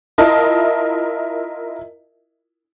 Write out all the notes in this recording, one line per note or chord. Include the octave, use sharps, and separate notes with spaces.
E4 F4 A#4 D#5 E5 A5